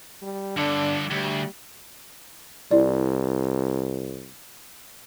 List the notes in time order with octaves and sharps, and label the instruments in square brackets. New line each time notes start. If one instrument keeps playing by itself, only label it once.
[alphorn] G3
[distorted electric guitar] G2 D3 [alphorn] D4
[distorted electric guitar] D2 [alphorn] G3
[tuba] C2 [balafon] E4 D5